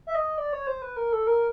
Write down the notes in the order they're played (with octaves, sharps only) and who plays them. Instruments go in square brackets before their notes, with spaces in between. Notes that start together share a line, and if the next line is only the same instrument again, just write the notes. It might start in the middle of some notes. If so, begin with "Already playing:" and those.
[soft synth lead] E5
D#5
D5
C#5
C5
B4
A#4
A4
A#4